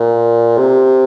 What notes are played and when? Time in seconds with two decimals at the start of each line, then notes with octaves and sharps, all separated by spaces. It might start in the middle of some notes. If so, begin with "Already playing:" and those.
Already playing: A#2
0.58 C3